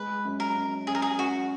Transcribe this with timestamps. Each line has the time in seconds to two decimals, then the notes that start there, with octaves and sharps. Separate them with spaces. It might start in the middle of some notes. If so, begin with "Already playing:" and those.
Already playing: G#3 B4
0.25 F#2
0.40 A#4
0.56 F#2
0.87 F#2 G#4
0.95 A#4
1.02 G#4
1.19 F#2 F#4